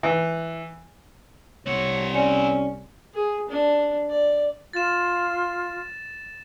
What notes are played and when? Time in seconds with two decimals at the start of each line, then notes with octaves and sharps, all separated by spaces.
0.03 E3
1.66 C2 C4 C#5 F#5
2.14 C#4 D5 G#5 C#7
3.14 G#4
3.49 D4
4.10 D5
4.73 F4 A6 E7